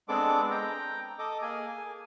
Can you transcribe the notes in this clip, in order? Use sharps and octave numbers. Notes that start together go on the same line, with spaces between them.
G#3 B3 C4 D4 A4 D6
G5 A#5
A4 D#5 D6
A#3 G#4 G#5
G#5